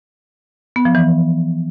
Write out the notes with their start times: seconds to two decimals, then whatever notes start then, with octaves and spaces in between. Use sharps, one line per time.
0.76 B3
0.85 F3
0.95 E3